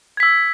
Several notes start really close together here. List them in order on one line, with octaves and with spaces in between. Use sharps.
G#6 B6 E6